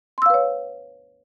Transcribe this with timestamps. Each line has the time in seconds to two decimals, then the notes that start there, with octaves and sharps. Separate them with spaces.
0.18 C6
0.22 E6
0.26 F5
0.30 B4
0.34 C#5